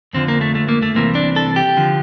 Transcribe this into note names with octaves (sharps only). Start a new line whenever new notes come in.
F2 D3 F3 C4
A#3
A3
A3
A#3
A3
C2 C3 E3 A#3
D4
A4
G4
D3 F3